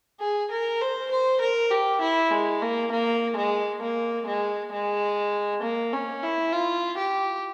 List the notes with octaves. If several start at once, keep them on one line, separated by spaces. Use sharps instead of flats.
G#4
A#4
C5
C5
A#4
G4
E4
G#3
A#3
A#3
G#3
A#3
G#3
G#3
A#3
C#4
E4
F4
G4